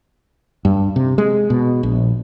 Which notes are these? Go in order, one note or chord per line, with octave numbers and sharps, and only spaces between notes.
G2
C3
G#3
B2
A#1